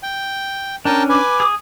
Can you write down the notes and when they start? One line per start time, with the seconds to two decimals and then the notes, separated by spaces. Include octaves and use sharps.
0.03 G5
0.85 C#4 D4 A#4 G5 A5
1.09 B4 G#5 D6
1.40 G#4 D#6